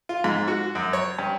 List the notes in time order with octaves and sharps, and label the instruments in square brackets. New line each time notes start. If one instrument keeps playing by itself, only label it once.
[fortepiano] F4
G#2
F#4
F#2
C#5
G2